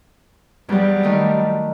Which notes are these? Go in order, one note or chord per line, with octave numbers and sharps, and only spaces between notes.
E2 F#3 G3
D#3 A3